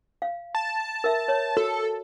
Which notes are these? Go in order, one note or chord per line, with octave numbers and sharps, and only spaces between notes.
F5
A5
A#4 E5
C#5
F#4 A4